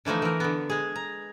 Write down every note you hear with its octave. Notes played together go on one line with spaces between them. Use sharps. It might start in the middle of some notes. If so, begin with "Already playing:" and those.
D3 E3 F3 A3 D#4
E3 A#4
D3 B3
G#3 G#4
A#5